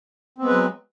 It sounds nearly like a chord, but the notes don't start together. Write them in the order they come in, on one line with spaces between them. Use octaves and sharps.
C4 B3 G#3 B4 F#3